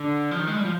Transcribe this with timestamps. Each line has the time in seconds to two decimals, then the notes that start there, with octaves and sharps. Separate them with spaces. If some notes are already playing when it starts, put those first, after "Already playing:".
Already playing: D3
0.31 F3
0.39 D#3
0.47 G#3
0.56 G3
0.65 F3